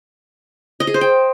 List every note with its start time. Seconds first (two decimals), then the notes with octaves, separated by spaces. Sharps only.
0.80 D#5
0.87 G#4
0.94 C5
1.01 G5